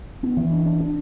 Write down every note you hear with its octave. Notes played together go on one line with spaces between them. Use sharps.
B3
E3
D4
D4
D4